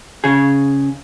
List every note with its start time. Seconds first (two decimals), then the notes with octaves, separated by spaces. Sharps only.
0.24 C#3 G#4